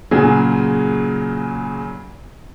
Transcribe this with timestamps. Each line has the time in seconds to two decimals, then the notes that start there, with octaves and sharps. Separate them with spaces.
0.11 A#2 C#3 F#3 G#4